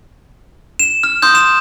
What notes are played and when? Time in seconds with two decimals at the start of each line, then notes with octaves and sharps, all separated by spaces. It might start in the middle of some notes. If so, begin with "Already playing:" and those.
0.79 E7
1.03 F6
1.22 C6 D#6 G6
1.35 E7